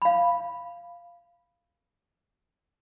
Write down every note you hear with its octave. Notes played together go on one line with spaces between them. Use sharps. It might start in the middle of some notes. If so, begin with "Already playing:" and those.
F5 B5